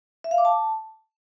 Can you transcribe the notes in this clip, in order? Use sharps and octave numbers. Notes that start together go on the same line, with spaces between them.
E5
F5
D6
A5